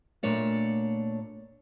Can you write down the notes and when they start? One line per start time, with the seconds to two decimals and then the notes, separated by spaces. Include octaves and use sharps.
0.23 A#2 A3 D4 C#5 D5